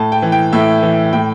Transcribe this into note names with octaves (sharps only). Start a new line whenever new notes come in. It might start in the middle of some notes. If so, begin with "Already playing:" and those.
Already playing: A2 A5
G5
E3
G5
A2 E5
E3
A2 G5